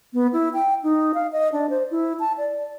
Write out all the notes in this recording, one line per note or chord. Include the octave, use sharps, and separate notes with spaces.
B3
E4
G5
D#4
F5
D#5
D4
C5
E4
A5
D5